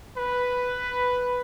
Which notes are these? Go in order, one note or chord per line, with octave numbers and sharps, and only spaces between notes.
B4